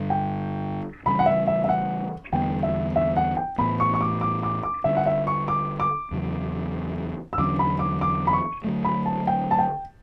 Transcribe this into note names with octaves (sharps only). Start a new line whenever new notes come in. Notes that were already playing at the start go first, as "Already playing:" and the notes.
Already playing: G2 D3 G3
G5
C#3 E3 G3 C#4 B5
F#5
E5
E5
E5
F#5
E2 D3 G3 B3 G5
E5
E5
F#5
G5
A2 E3 B3 B5
C#6
C#6
D6
D6
D6
D6
D3 G3 C#4 E5
F#5
E5
C#6
D6
D6
E2 C#3 F#3
E6
E2 D3 F#3 C#4 D6
B5
D6
D6
B5
C#6
D3 F#3 A3
B5
A5
G5
A5
G5